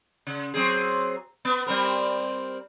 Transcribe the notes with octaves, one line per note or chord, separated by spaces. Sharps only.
C#3
F#3 C4 G#4
B3
G3 C4 A#4